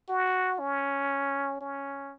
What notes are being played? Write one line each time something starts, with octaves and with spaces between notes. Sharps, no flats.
F#4
C#4
C#4